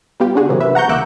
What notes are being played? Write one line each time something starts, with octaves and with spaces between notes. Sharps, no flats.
G3 B3 F4 G4
C#3 D4 F#4 G#4
G#2 C3 E3 F#3 A#3 C4
B4 E5
F#5 A#5 C#6 G6
C#2 E3 A#3 D6 E6 F#6